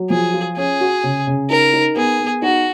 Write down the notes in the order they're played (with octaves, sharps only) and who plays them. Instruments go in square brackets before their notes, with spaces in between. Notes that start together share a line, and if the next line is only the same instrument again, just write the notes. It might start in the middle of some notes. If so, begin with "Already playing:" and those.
Already playing: [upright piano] F#3
[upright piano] F3 [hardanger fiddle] G#4
[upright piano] F4
[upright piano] C#4 [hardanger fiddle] G#4
[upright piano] F#4
C#3
C#3
[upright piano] D#4 [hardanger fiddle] A#4
[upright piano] D#4
[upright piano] B3 [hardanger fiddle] G#4
[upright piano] B3
[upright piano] D#4 [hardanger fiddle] F#4